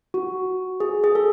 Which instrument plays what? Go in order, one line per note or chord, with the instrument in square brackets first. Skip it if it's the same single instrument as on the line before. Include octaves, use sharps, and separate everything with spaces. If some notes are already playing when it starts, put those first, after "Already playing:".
[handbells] F#4
G#4
G#4
A4